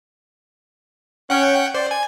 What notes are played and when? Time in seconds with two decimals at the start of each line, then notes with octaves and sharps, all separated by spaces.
1.30 C#4 F#5 G5
1.75 C5 D5
1.91 G#5